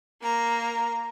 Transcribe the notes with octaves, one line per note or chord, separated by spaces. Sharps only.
A#3 A#5